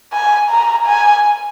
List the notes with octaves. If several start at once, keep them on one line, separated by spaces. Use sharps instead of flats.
G#5
A#5
G#5